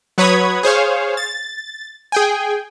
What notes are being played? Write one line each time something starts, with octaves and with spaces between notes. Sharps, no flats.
F#3 B4 C#5 B5 D#6 G#6
G#4 C5 C#5 F5
A6
G#4 G5 G#5